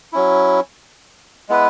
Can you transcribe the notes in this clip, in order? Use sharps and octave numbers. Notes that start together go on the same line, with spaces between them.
F#3 C#4 E4
G#3 B3 E4 B4